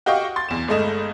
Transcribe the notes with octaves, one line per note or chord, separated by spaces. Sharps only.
F#4 G4 D#5 F5 G5 C#6
C6 A6
E2 E7
G1 G#3 A3 D#5 E7